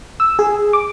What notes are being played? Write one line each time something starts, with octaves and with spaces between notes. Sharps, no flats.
E6
G#4
D6